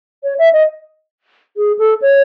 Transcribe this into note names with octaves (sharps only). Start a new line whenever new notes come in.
C#5
E5
D#5
G#4
A4
C#5